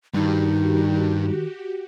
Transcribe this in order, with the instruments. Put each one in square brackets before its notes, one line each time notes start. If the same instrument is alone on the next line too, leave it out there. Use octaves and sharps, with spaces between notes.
[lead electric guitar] G2 [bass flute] D#3 [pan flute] D#4 [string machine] F#4 G4